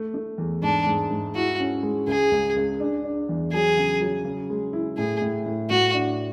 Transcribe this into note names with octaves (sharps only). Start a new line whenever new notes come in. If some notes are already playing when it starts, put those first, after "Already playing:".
Already playing: A3
A3
E2
G#2 D4
G#2
G#2
E4 F#4
C#4
G#3
C#2 G#4
C#2
C#2
D4
D4
E2
F#3 G#4
C#3
F#3
C#3
G#3
E4
A2 G#4
A2
A2
A2 F#4
D4